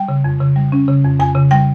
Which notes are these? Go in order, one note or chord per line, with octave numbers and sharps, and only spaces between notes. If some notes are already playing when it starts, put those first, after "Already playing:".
Already playing: G3 G5
C#3
F2
C#3
G3
C#4
C#3
F2
F2 G#5
C#3
G3 G5